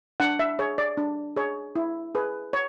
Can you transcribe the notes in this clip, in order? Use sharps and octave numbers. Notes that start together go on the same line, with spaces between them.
D4 F#5
E5
G#4 C#5
D5
D4
G#4 C#5
E4
G#4 B4
C#5